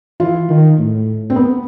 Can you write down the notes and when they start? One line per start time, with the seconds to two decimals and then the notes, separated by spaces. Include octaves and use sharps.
0.20 E3 F4
0.49 D#3
0.78 A2
1.30 C4
1.36 B3